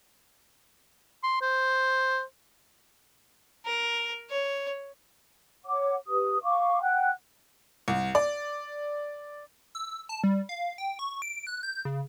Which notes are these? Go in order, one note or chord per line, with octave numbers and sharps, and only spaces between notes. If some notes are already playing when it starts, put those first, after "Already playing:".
C6
C5
A#4
C#5
C#5 F#5 D6
G4 B4 D#6
F5 C#6 D6
F#5 G5 F#6
C2
D5
E6
A5
G3
F5
G5
C#6
D7
F#6
G6
C#3